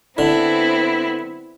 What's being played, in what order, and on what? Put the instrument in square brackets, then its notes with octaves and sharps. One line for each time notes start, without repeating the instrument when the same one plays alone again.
[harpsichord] D3 [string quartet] B3 C4 E4